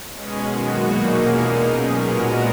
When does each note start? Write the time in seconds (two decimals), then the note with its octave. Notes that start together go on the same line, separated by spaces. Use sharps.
0.12 B2 G#3 C#4 G#4
0.42 F#2 D#3 G#3 B3 F#4
0.75 A#2 F#3 A#3 D#4 F#4
1.07 E2 B2 A#3 C#4 G#4
1.39 A#2 G#3 D#4 A#4
1.70 B2 F#3 C#4 G#4
2.02 A#2 G#3 B3 F#4 A#4